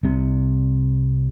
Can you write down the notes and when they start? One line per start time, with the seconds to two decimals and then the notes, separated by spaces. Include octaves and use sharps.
0.03 C2 C3